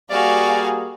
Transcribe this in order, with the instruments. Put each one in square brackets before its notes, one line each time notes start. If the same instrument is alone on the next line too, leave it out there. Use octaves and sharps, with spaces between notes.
[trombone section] G3 A#3 G#4 [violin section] F#4 F5 G#5 [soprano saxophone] D5